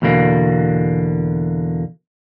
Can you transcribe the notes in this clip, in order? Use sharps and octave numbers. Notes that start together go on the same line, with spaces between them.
E2 B2 D3 A#3